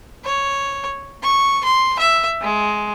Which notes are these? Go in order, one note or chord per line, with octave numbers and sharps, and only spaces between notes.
C#5
C#6
C6
E5
G#3